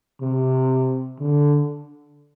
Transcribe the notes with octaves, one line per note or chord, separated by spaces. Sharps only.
C3
D3